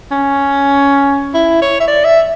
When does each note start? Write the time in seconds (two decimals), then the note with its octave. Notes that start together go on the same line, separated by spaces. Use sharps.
0.11 C#4
1.34 E4
1.62 C#5
1.80 E5
1.88 D5
2.05 E5